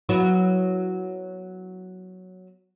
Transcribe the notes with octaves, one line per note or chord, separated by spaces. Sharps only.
F#3 B3 E4